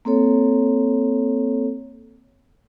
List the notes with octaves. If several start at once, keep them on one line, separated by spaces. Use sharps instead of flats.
A#3 C4 A4 C#5